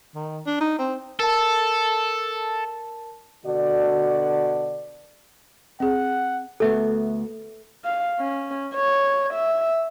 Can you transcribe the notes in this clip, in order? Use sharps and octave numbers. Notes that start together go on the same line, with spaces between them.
D#3
D4
D#4
C4
A4 A#4 A5
B2 D3 D4 F#4 D5
C4 G#4 F#5
D2 A3 B3 A4 E5
F5
C#4
C#5
E5